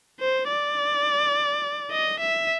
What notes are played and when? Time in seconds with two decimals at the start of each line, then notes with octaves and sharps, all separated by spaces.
0.20 C5
0.48 D5
1.92 D#5
2.20 E5